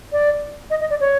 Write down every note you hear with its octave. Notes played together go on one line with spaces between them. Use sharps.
D5
D#5
D#5
D5
C#5